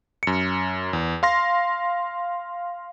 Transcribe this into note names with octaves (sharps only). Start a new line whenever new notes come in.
F#2 C#7
E2
F5 C6 A#6